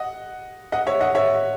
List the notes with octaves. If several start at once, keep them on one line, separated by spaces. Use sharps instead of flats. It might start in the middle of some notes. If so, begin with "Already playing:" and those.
Already playing: D#5 F#5
D#5 F#5
C#5 E5
D#5 F#5
C#5 E5